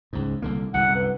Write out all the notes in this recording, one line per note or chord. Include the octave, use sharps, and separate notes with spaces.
C#2 G#2
C2 D3 A#3
C2 F#2 D3 F#5
B4